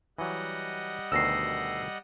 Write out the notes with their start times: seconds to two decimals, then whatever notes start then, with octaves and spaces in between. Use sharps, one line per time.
0.18 E3 F#3 G3 D#5 F#5
1.12 D2 B2 D#3 E6 A#6 C7